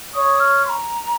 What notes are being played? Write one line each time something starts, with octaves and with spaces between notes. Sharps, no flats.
C#5 D#6
F6
C6
A#5